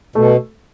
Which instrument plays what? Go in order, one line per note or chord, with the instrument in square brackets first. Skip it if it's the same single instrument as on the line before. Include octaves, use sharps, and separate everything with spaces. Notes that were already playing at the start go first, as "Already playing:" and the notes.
[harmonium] B2 [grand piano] A3